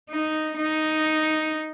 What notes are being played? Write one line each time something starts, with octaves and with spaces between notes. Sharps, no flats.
D#4
D#4